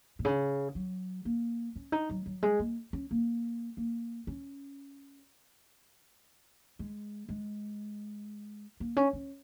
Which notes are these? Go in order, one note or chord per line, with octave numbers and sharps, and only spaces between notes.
A#2
C#3
F#3
A#3
C#4
D#4
F#3
F#3
G#3
A#3
C#4
A#3
A#3
C#4
G#3
G#3
A#3
C#4
C#4